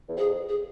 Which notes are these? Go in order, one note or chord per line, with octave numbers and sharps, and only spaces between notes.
E2
F2 G#4
G#4